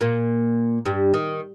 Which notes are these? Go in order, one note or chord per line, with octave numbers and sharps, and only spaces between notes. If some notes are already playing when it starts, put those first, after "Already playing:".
A#2 A#3
G2 G3
D#3